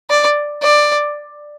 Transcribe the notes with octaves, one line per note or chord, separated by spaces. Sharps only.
D5
D5